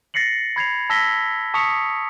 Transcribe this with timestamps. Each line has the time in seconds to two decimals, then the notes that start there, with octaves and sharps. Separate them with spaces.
0.14 A6 A#6 C7 C#7 F#7
0.56 B5 G#6 C7 F7
0.90 A5 E6 A#6 B6 G7
1.54 A5 C#6 D#6 B6 C#7 F7